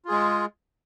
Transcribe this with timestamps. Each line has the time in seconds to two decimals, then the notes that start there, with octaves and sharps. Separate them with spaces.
0.05 F4
0.08 G#4
0.11 G#3